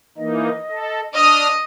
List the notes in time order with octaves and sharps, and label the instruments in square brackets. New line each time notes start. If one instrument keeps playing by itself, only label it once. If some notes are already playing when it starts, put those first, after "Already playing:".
[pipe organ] E3 A#3 D#4 [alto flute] D#5
[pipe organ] A4
[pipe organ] D4 D#6 F6 [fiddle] D#5